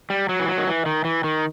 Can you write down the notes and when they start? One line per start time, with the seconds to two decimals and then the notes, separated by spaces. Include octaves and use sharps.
0.10 G3
0.29 F#3
0.39 E3
0.48 F#3
0.58 D#3
0.67 E3
0.86 D#3
1.05 E3
1.24 D#3